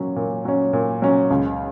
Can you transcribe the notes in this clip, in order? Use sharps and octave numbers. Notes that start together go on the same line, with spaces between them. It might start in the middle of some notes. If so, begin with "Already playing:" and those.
Already playing: A#2 F#3 C#4
A#2
F#3 C#4
A#2
F#3 C#4
C#2